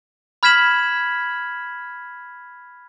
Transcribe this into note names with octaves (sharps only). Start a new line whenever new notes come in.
B5 F6 G#6 B6 E7 F#7